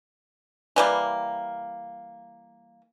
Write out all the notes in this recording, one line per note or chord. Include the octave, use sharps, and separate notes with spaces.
E3 G3 A#3